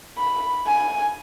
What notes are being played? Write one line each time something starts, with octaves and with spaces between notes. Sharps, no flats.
B5
G#5